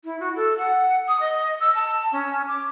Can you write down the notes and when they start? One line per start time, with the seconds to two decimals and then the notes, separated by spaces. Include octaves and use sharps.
0.04 E4
0.20 F#4
0.36 A4
0.58 F#5
1.08 D#6
1.20 D#5
1.60 E6
1.75 A5
2.12 C#4
2.48 D6